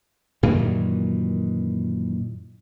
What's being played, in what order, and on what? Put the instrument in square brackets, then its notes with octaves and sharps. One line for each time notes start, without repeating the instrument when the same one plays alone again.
[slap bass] F#2 A#2 D#3 E3